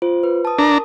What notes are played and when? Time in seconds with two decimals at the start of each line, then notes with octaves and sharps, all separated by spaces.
0.02 F4 C5
0.23 B4
0.45 A5 D#6
0.58 D4 A#4 A#5